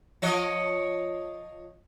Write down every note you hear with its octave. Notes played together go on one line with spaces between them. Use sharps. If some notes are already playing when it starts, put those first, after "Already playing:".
F3 C#5 D#5